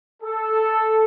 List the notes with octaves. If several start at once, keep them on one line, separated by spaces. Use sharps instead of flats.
A4